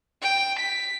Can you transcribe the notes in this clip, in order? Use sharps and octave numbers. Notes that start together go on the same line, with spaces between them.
G5
B6